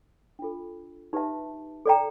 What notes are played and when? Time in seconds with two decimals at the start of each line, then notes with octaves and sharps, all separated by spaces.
0.39 D4 F4 A4
1.13 D#4 G4 B4 E5 A5
1.86 A4 D5 G5 A#5